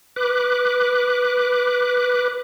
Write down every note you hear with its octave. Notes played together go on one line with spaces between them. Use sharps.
B4 D6 F#6